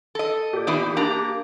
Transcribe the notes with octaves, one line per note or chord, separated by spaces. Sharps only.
A4 D#5
A#2 G4
E3 B3 D#4
A#3 D4 A#5